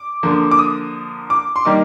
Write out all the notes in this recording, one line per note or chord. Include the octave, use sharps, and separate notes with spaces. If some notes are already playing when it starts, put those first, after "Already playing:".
Already playing: D6
D3 F3 A#3
D6
D#6
D6
C6
D#3 G3 A#3 D#4 D6